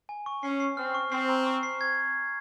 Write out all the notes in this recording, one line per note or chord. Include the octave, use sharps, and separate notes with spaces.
G#5
C#6
C#4 C7
C7
C4 F6
C#6
C4 C7
A#5
C#6
C7
G#6